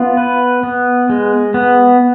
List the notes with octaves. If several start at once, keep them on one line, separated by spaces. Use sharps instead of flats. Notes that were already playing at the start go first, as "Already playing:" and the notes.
Already playing: B3 F4
B4
B3
G#3
B3